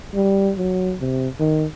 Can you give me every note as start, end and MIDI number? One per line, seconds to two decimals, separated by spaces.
0.15 0.52 55
0.57 0.95 54
1.00 1.28 48
1.39 1.66 51